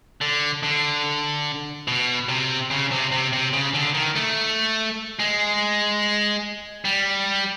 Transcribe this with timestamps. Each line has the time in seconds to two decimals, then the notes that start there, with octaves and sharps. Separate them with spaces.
0.21 D3
0.63 D3
1.88 B2
2.29 C3
2.71 C#3
2.91 C3
3.12 C3
3.33 C3
3.53 C#3
3.74 D3
3.95 D#3
4.16 A3
5.19 G#3
6.85 G3